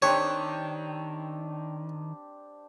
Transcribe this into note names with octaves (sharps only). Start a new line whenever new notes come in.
D#3 C4 D4 G4 C#5